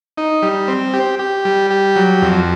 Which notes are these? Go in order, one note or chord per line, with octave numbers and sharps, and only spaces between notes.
D#4
G3
C4
G4
G4
G3
G4
F#3
F2